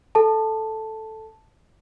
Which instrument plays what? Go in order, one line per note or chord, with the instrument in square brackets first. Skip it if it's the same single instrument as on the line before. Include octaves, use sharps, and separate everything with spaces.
[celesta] A4 A5